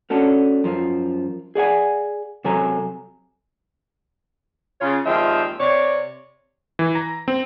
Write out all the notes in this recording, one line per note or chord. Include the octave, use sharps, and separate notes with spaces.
A3 C#4 D4 F#4 A4
F#2 F3
G#4 D5 F#5 G#5
C3 F#3 A4 G#5 A#5
C#3 F4 C#5
D#2 F3 G#3 C4 D5 E5
C3 C#5 D5
E3
A#5
C4